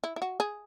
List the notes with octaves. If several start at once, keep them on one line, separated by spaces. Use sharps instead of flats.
E4
E4
F#4
G#4